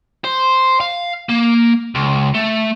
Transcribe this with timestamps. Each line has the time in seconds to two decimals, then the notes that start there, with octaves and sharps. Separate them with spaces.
0.24 C5
0.80 F5
1.29 A#3
1.95 C#2
2.34 A3